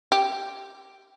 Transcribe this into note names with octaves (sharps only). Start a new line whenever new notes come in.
G4